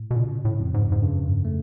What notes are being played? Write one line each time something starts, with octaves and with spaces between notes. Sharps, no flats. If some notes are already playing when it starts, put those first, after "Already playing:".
Already playing: A2
B2
A#2 C#3
A2
F2
G#2
G#2
G2 C#3
A3